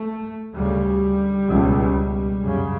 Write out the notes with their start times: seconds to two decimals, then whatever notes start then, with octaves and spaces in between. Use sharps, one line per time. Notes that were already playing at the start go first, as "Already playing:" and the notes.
Already playing: A3
0.54 D2 C#3 G3
1.48 C#2 B2
2.41 F#2 C#3